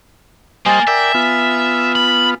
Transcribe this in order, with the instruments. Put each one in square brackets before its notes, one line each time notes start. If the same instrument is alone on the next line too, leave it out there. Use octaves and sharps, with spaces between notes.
[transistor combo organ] G3 C5 D#5 [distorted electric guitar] A#3 [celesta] G#5 A6
[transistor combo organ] A#4 D5 G5 [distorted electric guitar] E5
[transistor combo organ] B3 F4
[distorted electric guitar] B5